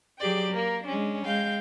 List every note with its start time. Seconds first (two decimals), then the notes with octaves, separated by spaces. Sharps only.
0.18 F#3 G4 G#4 D5 G5
0.50 A#3 A#4
0.84 G#3 C#4 D4
1.24 G#3 F5 G5 G6